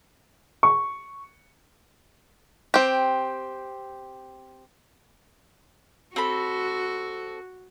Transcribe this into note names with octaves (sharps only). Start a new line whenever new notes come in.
C#6
C4 G4
C4 F#4 A4 B5